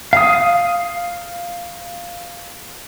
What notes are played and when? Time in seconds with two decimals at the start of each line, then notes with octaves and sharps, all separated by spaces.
0.13 F5 D#6